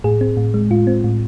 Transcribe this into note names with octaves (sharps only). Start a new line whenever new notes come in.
A2 G#4
C4
A2
G#3
A2 F4
C4
A2